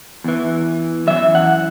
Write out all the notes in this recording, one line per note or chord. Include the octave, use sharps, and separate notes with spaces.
E2 E3
F#2 E3 E5
F#5